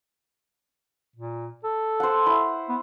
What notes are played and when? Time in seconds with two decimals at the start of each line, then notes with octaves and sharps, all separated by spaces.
1.16 A#2
1.64 A4
2.00 C5 F#5
2.26 E4
2.69 B3